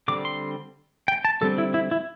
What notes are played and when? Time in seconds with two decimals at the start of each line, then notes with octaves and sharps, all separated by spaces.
0.08 D3 G3 C4 D6
0.25 C6
1.08 G5
1.25 A5
1.41 D3 G3 C4 A4
1.58 E4
1.74 E4
1.91 E4